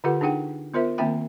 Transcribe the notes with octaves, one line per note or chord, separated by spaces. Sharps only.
D3 F4 G4 A4 B4 F#5
D4 D#4 G#4 F#5 G5
B3 F4 A#4 C5 E5
D#3 A#3 C4 E5 G5 B5